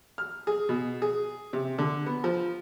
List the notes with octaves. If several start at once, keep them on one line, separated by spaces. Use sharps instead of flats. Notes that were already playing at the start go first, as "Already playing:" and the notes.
F6
G#4
B2
G#4
C3
D3
B3
F3